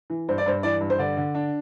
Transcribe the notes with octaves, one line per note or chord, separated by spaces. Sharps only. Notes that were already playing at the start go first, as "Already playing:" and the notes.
E3
G2 C5
D5
G2 C5
E3 D5
G2
C5
D3 D5
D3
D4